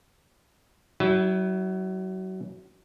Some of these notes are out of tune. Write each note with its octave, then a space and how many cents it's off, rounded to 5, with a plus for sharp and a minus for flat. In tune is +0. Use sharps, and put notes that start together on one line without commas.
F#3 +25 E4 -25